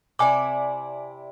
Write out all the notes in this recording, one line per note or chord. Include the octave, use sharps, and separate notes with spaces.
C3 E4 D5 G#5 D6